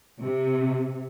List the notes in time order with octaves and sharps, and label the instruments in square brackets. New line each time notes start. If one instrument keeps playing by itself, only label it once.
[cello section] C3